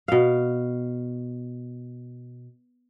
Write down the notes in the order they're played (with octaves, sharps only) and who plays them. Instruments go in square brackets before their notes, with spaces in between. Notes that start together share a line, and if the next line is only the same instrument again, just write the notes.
[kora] B2 F5